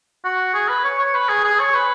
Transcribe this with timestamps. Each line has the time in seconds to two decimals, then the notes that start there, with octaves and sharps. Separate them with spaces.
0.24 F#4
0.54 G#4
0.69 B4
0.84 C#5
0.99 C#5
1.14 B4
1.29 G#4
1.44 G#4
1.59 C#5
1.74 B4